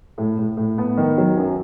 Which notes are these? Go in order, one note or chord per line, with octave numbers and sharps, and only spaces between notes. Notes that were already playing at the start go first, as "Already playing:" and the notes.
A2
A2
A2
B3
D#3
F#3
F#2